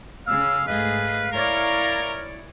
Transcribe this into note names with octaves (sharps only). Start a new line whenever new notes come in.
C#3 G#4 F5 E6
G#2 A3 G#4 B4 D#5 F5
E4 A#4 C#5 D5 A#5